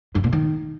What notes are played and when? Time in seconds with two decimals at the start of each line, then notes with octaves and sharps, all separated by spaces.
0.15 G2
0.24 A#2
0.33 D#3